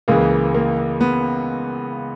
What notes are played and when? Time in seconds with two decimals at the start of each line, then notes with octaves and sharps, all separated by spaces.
0.08 C#2 C#3 E3 A#3
0.54 A#3
1.01 B3